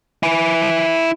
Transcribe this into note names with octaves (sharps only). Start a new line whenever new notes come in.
E4 G#5